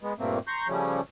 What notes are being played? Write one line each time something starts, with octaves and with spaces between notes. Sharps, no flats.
G#3 B3
G2 A#2 A3 A#3 C4
A#5 C6 C#6 G6
C#3 F3 G3 A3 C#4